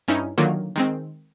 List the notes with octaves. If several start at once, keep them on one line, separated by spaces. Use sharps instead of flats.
G2 C#4 D#4 E4
D3 D#3 F#3 A#3 F4
D#3 G#3 C4